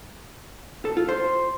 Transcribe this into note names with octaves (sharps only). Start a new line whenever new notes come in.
A4
F4
C5